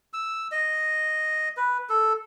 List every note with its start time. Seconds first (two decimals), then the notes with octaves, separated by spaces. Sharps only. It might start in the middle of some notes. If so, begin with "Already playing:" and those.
0.13 E6
0.52 D#5
1.57 B4
1.89 A4